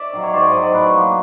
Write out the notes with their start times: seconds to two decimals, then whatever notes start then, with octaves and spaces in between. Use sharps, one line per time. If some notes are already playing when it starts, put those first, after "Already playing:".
Already playing: D5 E5
0.13 D#3 F#3
0.23 C#5
0.33 G#2 C5 D5
0.51 D#3 F#3 D#5
0.62 D5
0.74 A2 B4 C#5
0.95 F#3 A#3